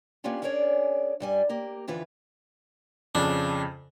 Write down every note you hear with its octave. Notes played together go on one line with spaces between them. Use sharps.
A#3 B3 C#4 D4 F4 G4
C#4 D4 G#4 A#4 C#5 D5
G2 G3 G#5
A#3 G4 A#4
F2 D3 E3 F4 B4
F2 C#3 D4